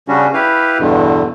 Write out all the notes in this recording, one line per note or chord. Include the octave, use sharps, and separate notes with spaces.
C#3 G3 C#4 D4 F#4
E4 G4 B4 F5
E2 G2 B2 D3